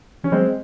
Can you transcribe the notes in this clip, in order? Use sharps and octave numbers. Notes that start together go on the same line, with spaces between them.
E3 C#4
F#3 G#3 C4